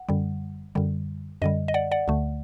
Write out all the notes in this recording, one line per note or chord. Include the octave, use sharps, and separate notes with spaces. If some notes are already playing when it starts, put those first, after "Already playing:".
Already playing: F#5
F#2 D3 G3
F#2 D3 G3
F#2 D3 G3 D#5
D#5
D5 F#5
D5 F#5
D2 D3 A3